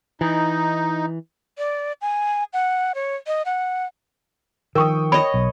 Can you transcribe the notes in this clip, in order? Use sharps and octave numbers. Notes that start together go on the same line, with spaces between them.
E3 D#4
D5
G#5
F#5
C#5
D#5
F#5
D#3 F3 A#4 G5 C#6 D#6
C#5 D#5 B5
B1